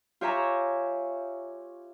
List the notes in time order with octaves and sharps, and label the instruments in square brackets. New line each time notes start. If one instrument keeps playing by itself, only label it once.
[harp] F4 G4 C#5 E5 G#5 A#5